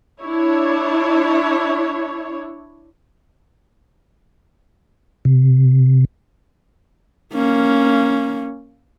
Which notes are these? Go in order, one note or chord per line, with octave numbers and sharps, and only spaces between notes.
D4 E4 C#5
C3
A#3 C#4